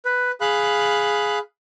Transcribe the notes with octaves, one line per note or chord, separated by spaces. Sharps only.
B4
G#4 F5 B5 F#6